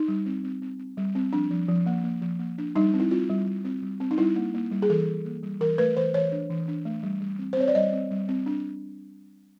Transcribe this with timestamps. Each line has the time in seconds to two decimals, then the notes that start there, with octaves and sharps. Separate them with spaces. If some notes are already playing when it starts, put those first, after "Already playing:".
Already playing: D#4
0.08 G3
0.26 C4
0.44 C4
0.62 C4
0.79 C4
0.98 G3
1.15 C4
1.33 F3 D4
1.51 F3
1.69 F3
1.86 A#3
2.04 A#3
2.22 F3
2.40 A#3
2.58 D4
2.76 G3 D#4
2.94 C4
3.00 E4
3.11 C4 F4
3.29 G3
3.47 G3
3.65 C4
3.82 G3
4.00 C4
4.11 D#4
4.18 G3 E4
4.36 A#3
4.54 A#3
4.72 G3
4.82 G#4
4.90 E3 A4
5.08 E3
5.25 A#3
5.43 G3
5.61 E3 A#4
5.78 A3 B4
5.96 E3 C5
6.14 E3 C#5
6.32 D4
6.50 E3
6.68 D4
6.85 A3
7.03 G3
7.21 G3
7.39 C4
7.53 C5
7.57 C4 C#5
7.68 D5
7.75 G3 D#5
7.93 C4
8.11 G3
8.28 C4
8.46 D4